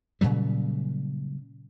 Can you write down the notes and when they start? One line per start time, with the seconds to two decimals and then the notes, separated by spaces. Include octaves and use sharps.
0.21 A#2 C#3 F#3 G3